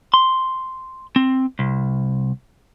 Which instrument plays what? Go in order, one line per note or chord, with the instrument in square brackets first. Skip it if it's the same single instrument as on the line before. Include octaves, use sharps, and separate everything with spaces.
[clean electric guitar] C6
C4
C2